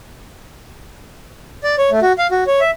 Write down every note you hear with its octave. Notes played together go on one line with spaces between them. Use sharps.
D5
C#5
A3
F#4
F5
F#4
C#5
E5